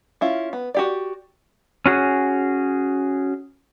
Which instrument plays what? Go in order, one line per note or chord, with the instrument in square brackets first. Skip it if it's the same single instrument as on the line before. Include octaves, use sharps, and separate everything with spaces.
[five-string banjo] C#4 E4 F4
B3
F#4 G4 D5
[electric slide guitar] C#4 F#4 G#4